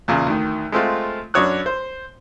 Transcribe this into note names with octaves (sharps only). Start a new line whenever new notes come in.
E2 A#2 C#3
D2 D#3
G#3 A3 C4 F4
F#2 D4 F#4 C#5 D#6 F#6
C5